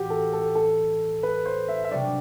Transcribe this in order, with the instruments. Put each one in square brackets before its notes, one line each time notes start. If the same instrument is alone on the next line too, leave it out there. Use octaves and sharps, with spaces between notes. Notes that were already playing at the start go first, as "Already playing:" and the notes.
Already playing: [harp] A2 E3 [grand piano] F#4 G4
[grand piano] A4
A4
A4
B4
C5
E5
E5
[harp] C3 G3 D4 F#4 [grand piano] D5